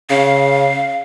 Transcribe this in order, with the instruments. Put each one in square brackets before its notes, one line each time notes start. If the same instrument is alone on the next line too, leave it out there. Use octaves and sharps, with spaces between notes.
[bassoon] C#3 [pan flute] F5